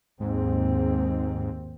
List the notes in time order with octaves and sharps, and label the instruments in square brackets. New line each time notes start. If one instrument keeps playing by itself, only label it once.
[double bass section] D#2 C4 [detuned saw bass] G#2